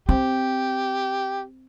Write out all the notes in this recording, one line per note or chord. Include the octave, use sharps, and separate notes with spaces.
C4 G4